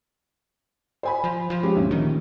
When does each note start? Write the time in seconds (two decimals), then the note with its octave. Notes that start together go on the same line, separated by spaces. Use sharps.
1.03 C5 G#5 B5
1.24 F3
1.50 F3
1.63 G#3 C#4 G4
1.76 D2 A#2 C#4
1.91 D#3